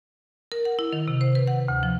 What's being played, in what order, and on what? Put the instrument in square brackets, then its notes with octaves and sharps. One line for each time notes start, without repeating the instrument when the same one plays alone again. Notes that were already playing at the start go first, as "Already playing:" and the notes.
[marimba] A#4
F#5
E4
D#3
C3
C5
B4
F#5
D2
F3